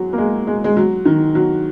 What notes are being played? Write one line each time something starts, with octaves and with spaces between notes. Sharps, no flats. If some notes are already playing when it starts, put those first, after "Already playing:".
Already playing: F#3 G#3
A#3
G#3
G#3
G#3
F#3
D#3
F#3